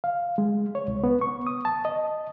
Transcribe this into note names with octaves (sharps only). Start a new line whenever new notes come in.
F5
G#3
C#5
C2
B3
C#6
D#6
A5
D#5